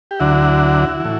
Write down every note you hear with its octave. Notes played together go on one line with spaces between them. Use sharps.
G4
D2 D3 F#3 E4 F#4
A2 E3